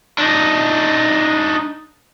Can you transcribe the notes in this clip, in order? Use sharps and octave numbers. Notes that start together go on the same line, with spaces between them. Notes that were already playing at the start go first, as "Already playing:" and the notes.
D4 D#4